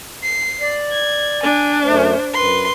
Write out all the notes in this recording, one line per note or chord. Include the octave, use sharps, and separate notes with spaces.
C7
D5
G#6
D4 G#5
F#2 A3 C5
F#2 B4 C6